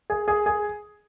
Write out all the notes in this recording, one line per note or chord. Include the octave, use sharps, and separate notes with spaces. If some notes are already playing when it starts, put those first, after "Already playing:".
G#4
G#4
G#4